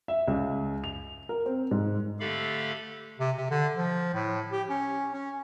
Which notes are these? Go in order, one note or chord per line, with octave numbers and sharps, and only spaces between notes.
E5
C#2
F7
A#4
C4
G#2
D3 A3 G4 A4 F5 B5
C3
C3
D3
F3
A2
G4
C#4
C#4